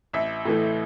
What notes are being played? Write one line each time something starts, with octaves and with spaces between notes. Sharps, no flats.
A1 E5
A2 E3 A3